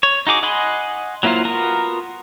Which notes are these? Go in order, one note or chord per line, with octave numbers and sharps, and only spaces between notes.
C#5
D#4 F#4 G#4 D6
D#5 F#5 G#5 B5 C6
F#3 A#3 E4 F4 C5
B3 F4 F#4 A#4